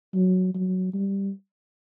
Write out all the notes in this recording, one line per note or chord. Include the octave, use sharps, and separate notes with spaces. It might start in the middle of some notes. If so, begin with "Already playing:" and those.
F#3
F#3
G3